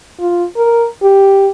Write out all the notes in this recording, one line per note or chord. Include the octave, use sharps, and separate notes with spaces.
F4
A#4
G4